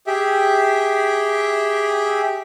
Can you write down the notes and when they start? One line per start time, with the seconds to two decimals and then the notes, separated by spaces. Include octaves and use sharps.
0.07 G4 G#4 E5